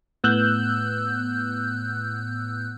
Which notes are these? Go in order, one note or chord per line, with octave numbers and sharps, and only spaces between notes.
A2 B3 E6 F#6 G6